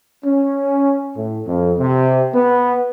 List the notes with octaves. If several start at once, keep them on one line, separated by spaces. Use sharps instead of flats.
C#4
A2
F2
C3
B3